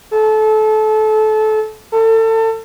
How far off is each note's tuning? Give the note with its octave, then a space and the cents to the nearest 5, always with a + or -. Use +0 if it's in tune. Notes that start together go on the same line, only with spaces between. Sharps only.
A4 -25
A4 +30